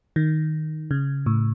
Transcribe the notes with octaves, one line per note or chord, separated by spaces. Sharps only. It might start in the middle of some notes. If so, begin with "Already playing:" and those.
D#3
C#3
A2